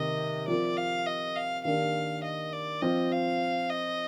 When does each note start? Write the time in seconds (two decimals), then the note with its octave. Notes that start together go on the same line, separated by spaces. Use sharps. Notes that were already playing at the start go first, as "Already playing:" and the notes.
Already playing: C3 D#3 A#3 D#5
0.48 F3 C4 F4 A#4 D5
0.77 F5
1.06 D#5
1.35 F5
1.65 D#3 A#3 D4 G4 F5
2.23 D#5
2.53 D5
2.82 F3 C4 F4 D#5
3.12 F5
3.70 D#5